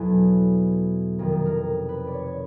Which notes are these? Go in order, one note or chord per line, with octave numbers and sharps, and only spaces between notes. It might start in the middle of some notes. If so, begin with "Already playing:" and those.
Already playing: E2 B2 F#3 B3 A4
F2 C3 D#3 A#4
A4
A#4
B4
D5
C#5
C#5